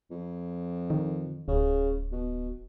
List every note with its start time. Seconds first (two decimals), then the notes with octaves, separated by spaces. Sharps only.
0.11 F2
0.90 D#3
1.48 D1 C#3
2.12 B2